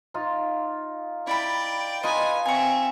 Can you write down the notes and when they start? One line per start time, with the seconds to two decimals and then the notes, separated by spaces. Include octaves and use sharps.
0.14 D#4 F4
1.27 E4 D5 G5 B5
2.03 D#4 F4 B4 D#5 G#5
2.46 C4 E5 G#5 C#6